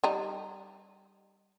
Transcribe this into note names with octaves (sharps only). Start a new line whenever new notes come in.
G3 D#4